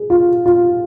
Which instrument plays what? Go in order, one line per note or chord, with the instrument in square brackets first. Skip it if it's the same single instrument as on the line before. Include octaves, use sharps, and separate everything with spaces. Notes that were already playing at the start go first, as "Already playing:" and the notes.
Already playing: [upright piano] G#4
F4
F4